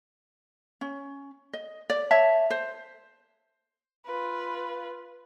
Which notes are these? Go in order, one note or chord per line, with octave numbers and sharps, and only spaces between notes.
C#4
D#5
D5
C#5 E5 A5
C5
F4 B4